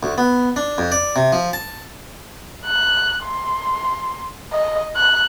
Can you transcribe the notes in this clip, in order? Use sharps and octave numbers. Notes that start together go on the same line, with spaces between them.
D2
B3
D4
F2
D5
C3
F3
A5
F#6
C6
D#5
F#6